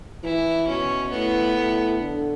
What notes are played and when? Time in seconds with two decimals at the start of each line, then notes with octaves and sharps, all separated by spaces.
0.24 E3 E4
0.67 B2 C#4
1.11 A2 B3
1.55 A2
1.99 D3